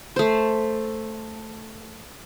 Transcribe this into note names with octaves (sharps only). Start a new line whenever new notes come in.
A3 C5